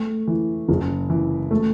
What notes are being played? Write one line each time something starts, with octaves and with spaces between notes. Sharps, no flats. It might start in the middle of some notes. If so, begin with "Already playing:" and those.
Already playing: A3
E3
F#1
E3
A3